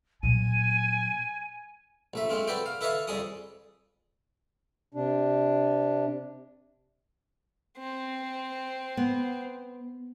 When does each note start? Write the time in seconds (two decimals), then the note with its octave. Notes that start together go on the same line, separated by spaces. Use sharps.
0.23 A#2 F#3 G#5 D#7
2.14 A#1 A3 E5
2.30 G#3 A3 C4 F4
2.48 F#4 A4 B4 D5 G5
2.66 F5
2.81 E4 A4 B4 C#5 D#5 F5
3.08 F2 G3 G#4 A4 D#6
4.94 C3 D4
7.78 C4
8.97 B3